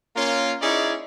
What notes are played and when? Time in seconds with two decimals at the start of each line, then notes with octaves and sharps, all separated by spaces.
0.15 A#3 C#4 F4
0.62 C#4 D#4 E4 G#4 C#5 D5